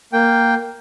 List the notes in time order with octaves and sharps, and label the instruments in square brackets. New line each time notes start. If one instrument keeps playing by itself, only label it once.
[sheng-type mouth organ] A#3 G5